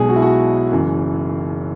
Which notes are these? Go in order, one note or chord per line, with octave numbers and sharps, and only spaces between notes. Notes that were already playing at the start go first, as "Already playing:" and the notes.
Already playing: B1 B2 G#3 G#4
F#4
E4
F#4
F#1 F#2 E3